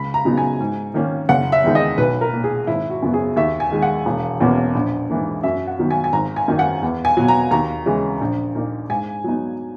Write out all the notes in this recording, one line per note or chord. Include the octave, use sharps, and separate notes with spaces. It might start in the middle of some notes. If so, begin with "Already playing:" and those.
Already playing: C#2 B5
A#5
C#3 F#3 B3 D#4
G#5
G#2
D#3 A#3 C#4
F#1 F#5
E5
E2 D#3 G#3 D#4
D#5
B1 B4
A#4
A#2 A#3
G#4
G#1 E4
F#4
F#2 C#3 F#3 B3
G#4
D#2 E5
G#5
D#3 G#3
F#5
E1
E2 B2 A#3 C#4
A#1
G#2 E3 A#3
F#2 E5
F#5
D#3 F#3 B3
G#5
G#5
G#1 A#5
G#5
F#2 D#3 A#3 D#4
F#5
E2
G#5
B2 F#3
A#5
D#2 A#5
C#3 E3 G#3 C#4
A#1
A#2 A#3 D#4
G#2 G#5
F#3 B3 D#4